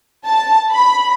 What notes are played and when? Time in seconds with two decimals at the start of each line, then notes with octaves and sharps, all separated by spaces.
0.25 A5
0.72 B5